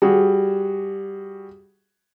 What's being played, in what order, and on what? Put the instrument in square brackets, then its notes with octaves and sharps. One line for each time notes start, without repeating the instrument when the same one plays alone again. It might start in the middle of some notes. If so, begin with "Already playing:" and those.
[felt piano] G3 F#4 G#4